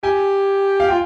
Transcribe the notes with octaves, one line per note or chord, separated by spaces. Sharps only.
G4 G#5
F5
F4 G5